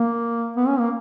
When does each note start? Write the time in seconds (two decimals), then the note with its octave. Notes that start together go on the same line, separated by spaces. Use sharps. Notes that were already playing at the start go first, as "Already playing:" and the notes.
Already playing: A#3
0.57 B3
0.67 C#4
0.79 A#3